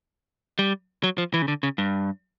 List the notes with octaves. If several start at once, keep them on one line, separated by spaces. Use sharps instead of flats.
G3
F#3
F3
E3
C#3
D3
C#3
G2